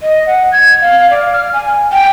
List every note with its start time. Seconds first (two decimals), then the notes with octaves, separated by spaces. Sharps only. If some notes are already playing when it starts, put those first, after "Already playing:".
0.02 D#5
0.27 F#5
0.52 G#6
0.82 F5
1.10 D5
1.33 F6
1.53 G#5
1.92 G5